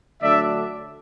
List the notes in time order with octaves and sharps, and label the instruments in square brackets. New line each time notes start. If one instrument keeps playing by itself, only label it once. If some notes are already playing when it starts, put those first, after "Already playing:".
[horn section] D3 F#3 A3 D4 D5 E5